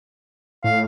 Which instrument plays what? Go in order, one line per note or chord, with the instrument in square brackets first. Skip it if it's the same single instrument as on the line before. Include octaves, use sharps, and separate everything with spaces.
[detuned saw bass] A2 [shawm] F5